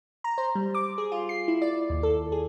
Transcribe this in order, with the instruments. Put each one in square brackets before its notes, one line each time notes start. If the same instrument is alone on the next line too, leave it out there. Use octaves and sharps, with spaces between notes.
[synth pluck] A#5
C5
G3
D6
G#4
F4
C7
E4
D5
D#2
A4
G#4